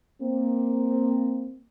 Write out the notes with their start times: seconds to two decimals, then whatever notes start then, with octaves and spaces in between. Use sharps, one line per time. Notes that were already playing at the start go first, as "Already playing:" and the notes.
0.22 A#3 C4